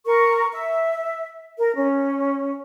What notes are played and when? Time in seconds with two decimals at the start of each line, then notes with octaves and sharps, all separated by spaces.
0.05 A#4 C#6
0.53 E5
1.58 A#4
1.76 C#4